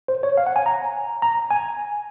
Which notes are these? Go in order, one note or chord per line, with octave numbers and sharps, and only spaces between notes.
C5
C#5
F5
F#5
G#5
A#5
A#5
G#5